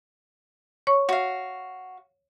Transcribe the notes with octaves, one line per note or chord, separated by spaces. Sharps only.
C#5 C#6
F#4 F5